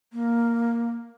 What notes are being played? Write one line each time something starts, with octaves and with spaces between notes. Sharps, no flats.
A#3